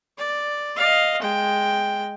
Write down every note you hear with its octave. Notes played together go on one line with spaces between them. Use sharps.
D5
D#5 F5
G#3 G5